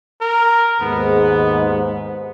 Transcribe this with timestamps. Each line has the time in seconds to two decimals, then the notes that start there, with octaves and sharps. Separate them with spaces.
0.21 A#4
0.81 D#2 G#2 B3